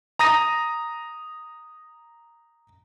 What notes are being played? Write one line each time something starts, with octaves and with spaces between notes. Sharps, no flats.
A#5 D#6 A#6 D#7